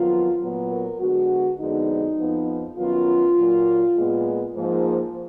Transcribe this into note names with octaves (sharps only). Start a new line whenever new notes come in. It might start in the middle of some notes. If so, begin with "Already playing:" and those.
Already playing: F2 D#3 F#3 B3 F4
A#2 F#3 B3
A#4
D3 G#3 B3 F#4
F2 D3 G#3 B3 D#4
F2 F3 B3
F#2 D#3 F#3 B3 F4
A#2 F#3 A#3
A#2 G#3 B3
G#2 F3 A#3